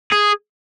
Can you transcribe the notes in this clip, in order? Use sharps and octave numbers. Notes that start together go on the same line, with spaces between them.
G#4